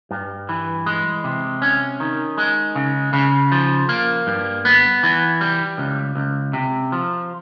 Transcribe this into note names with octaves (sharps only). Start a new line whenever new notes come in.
G2
E3
G#3
C3
C#4
D#3
G#3
C#3
C#3
F3
A#3
G2
B3
E3
G3
C#2
C#2
C3
F3